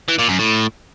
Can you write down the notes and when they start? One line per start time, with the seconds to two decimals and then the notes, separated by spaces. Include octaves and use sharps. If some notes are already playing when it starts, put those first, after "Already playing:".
0.09 E3
0.19 A#2
0.29 F#2
0.39 A2